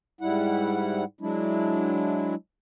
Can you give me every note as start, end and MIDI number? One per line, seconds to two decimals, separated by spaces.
0.21 1.04 44
0.21 1.04 55
0.21 1.04 64
0.21 1.04 78
1.21 2.35 54
1.21 2.35 56
1.21 2.35 62
1.21 2.35 64